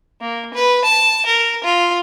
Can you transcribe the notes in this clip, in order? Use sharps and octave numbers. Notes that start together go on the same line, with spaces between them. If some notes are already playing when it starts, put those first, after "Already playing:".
A#3
B4
A5
A#4
F4